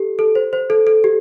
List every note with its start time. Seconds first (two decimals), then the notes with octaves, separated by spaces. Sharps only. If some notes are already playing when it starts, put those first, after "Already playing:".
Already playing: G4 A4
0.19 A4
0.35 C5
0.53 C5
0.70 A4
0.87 A4
1.04 G4